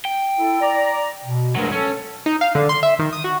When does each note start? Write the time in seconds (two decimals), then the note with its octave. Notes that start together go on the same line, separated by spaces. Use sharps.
0.05 G5
0.39 E4 A4
0.61 D5 A#5
1.24 B2
1.56 D2 G2 F#3 G#3 A#4
1.72 C#4 A4
2.26 D#4
2.41 F5
2.55 D3
2.69 C6
2.83 E5
2.99 D#3
3.13 D#6
3.24 F#4